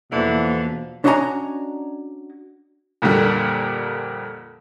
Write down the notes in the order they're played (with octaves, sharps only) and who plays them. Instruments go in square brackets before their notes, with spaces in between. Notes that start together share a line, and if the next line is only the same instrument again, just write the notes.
[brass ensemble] E2 F3 [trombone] B2 [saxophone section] D3 E3 [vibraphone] A#3
[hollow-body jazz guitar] C#4 D4 F#4 D#5 G#5 A#5
[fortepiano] F2 A#2 D3 G3